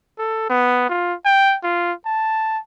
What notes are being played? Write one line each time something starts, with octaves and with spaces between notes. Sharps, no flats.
A4
B3
F4
G5
F4
A5